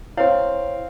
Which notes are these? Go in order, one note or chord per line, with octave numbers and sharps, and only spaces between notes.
C4 E4 C#5 F5